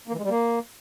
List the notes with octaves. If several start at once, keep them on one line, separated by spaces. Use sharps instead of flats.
A#3
E3
G#3
G3
A#3